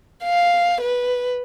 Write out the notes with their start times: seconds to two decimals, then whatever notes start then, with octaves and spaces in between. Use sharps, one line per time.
0.24 F5
0.81 B4